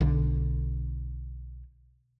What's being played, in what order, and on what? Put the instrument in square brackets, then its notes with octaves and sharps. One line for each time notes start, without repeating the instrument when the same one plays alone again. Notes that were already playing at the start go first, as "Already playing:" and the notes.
[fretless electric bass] B1 D3